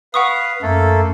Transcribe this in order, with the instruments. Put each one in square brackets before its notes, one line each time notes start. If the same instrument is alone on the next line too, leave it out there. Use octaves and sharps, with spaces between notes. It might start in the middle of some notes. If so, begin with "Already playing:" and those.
[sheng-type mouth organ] B4 F5 [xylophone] F#5 C#6 D#6
[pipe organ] F#2 [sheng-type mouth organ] A3 A#3 A4